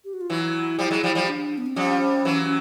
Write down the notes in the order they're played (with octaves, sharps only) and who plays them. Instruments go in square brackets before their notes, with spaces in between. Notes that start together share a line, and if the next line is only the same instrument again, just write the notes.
[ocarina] G4
F#4
F4
[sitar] E3 F#3 [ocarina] E4
[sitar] F3 G3
F#3 G#3
F3 G3
F3 G3
[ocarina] D4
B3
C4
[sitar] F3 G3 [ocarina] C#4
[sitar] E3 F#3